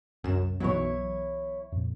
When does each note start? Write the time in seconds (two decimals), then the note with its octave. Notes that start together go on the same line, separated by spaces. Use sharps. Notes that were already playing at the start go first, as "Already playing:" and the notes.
0.24 C2 F#2 E7
0.60 B1 E3 F#3 B3 E4 C#5
1.72 F2 A#2